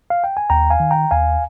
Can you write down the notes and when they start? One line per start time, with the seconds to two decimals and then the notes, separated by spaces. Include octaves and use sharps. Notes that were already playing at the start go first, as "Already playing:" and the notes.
0.10 F5
0.24 G5
0.37 G#5
0.50 D#2 G5 A#5
0.70 F5 G#5
0.80 D#3
0.91 G5 A#5
1.11 D#2 F5 G#5